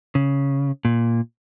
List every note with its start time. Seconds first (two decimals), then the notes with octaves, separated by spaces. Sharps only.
0.15 C#3
0.85 A#2